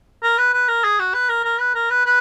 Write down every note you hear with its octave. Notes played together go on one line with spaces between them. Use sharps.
A#4
B4
B4
A#4
G#4
F#4
B4
A#4
A#4
B4
A#4
B4
B4